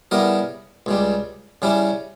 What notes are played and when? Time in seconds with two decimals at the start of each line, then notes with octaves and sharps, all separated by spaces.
0.11 C#3 G3 B3 E4 A#4
0.86 C#2 C#3 G3
1.62 C#3 G3 C#4 E4